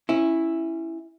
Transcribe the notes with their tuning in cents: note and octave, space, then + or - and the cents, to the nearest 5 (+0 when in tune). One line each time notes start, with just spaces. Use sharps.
C#4 -15 E4 +0